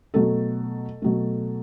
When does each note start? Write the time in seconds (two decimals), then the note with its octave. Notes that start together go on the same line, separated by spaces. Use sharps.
0.14 B2 F#3 A3 A4
1.02 B2 F#3 A3